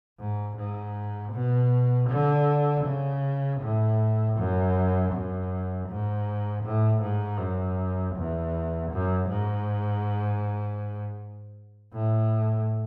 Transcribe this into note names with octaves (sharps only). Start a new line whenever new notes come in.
G#2
G#2
B2
D3
C#3
A2
F#2
F#2
G#2
A2
G#2
F#2
E2
F#2
G#2
A2